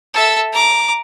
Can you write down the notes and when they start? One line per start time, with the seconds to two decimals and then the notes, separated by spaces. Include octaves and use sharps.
0.14 A4 E5
0.52 A#5 D6